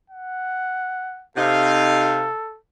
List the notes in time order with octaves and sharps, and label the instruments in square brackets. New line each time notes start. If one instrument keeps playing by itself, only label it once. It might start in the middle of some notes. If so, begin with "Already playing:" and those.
[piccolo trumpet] F#5
[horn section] C3 D#4 F5 [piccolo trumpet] A4